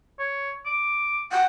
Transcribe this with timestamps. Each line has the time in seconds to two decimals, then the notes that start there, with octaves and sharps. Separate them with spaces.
0.19 C#5
0.66 D6
1.32 F#5 G5